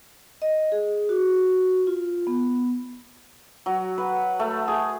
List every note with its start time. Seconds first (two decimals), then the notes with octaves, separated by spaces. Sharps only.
0.42 D#5
0.72 G#4
1.09 F#4
1.87 F4
2.27 B3
3.66 F#3
3.98 B4
4.40 A3
4.68 G#4